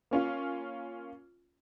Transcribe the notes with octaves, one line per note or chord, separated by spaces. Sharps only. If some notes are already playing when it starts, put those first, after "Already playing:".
A#3 C#4 F4